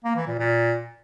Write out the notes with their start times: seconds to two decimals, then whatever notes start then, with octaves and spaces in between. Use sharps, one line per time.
0.04 A#3
0.16 E3
0.27 A#2
0.39 A#2